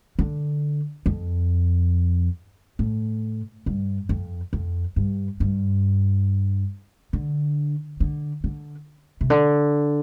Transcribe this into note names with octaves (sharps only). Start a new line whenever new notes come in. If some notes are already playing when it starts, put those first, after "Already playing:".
D3
F2
A2
G2
F2
F2
G2
G2
D3
D3
D3
C3
D3